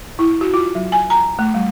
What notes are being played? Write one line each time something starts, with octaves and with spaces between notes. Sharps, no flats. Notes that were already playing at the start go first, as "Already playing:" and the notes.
E4
F#4
F4
F#3
G#5
A#5
A3
G3